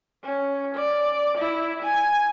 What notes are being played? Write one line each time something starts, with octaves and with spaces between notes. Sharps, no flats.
C#4
D5
E4
G#5